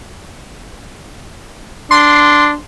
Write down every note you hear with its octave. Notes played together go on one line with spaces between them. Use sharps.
D4 C6